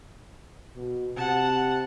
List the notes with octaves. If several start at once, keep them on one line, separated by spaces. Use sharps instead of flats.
B2
C3 F#5 A5